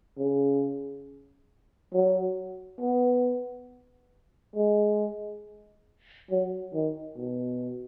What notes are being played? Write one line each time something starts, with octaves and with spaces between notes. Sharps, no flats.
C#3
F#3
B3
G#3
F#3
D#3
B2